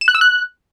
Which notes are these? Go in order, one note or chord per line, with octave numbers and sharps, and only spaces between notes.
E7
F#6
E6
F#6